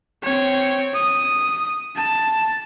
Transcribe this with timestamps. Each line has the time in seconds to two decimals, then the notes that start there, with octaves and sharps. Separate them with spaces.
0.23 C4 C#5
0.94 D#6
1.97 A5